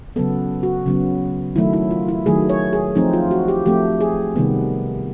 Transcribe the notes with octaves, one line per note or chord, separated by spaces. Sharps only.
C#3 F#3 B3 A4
F#4
C#3 F#3 B3
D#3 F#3 A3 E4
E4
F4
E4
D#3 F#3 A3 G#4
C#5
G#4
F3 A3 C4 D#4
F4
F#4
G4
F3 A3 C4 G4
G#4
C3 D#3 G3 B3